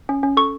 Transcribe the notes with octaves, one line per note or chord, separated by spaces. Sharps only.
C#4
C#4
A4 C#6